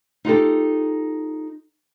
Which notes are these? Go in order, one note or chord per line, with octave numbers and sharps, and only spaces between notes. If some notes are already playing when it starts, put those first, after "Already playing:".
D#4 F4 G4 A4